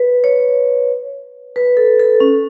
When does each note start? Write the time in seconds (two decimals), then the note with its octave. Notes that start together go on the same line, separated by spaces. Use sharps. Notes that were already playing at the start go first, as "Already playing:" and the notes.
Already playing: B4
0.24 C#5
1.56 B4
1.77 A4
1.99 A4
2.20 C#4